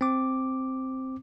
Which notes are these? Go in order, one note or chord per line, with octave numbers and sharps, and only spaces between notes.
C4 D6